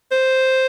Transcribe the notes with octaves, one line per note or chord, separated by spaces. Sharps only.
C5